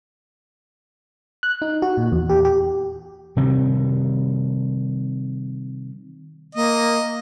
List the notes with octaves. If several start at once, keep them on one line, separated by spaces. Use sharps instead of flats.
F#6
D#4
F#4
A#2
E2
G4
G4
C3 D#3 G3
A#3 D#5